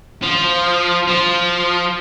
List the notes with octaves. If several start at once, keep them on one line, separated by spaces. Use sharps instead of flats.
F3
F3